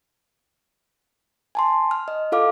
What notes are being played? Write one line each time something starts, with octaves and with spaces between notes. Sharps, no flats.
G#5 A5 C6
F6
D#5
F4 A4 F5 D6 F6